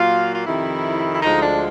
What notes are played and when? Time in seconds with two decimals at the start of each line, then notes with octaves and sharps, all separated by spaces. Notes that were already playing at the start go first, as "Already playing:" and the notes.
Already playing: A#2 F#3 A#3 F4
0.34 F4
0.46 F2 C3 D#3 E4
1.14 E4
1.23 D2 D3 F3 G#3 D#4
1.42 D4